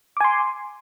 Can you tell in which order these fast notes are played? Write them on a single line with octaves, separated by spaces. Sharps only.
D6 G#5 C6